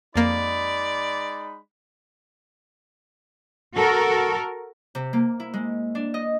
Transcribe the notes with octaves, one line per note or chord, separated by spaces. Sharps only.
F2 G#3 A#3 D#4 D5 B5
F#4 A4 A#4
C3
A#3
E4
G#3
D4
D#5